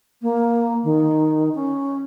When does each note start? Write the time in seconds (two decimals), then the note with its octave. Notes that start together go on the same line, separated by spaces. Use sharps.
0.22 A#3
0.84 D#3
1.55 C#4